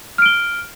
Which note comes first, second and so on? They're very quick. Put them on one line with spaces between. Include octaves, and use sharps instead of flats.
F6 D7 G7